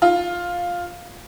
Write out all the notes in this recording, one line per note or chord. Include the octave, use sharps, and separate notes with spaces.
F4